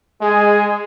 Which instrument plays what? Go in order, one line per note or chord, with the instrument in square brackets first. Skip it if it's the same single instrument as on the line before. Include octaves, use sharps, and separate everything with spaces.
[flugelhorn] G#3 [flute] G#4